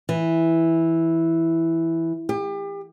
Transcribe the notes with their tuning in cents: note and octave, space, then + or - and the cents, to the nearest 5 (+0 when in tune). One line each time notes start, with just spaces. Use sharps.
E3 -5
G4 +35